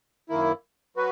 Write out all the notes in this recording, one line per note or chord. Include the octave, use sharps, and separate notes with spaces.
F#2 D#3 A#3 E4
F#3 F#4 B4